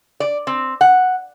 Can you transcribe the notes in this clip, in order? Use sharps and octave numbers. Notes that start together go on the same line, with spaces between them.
D5
C4
F#5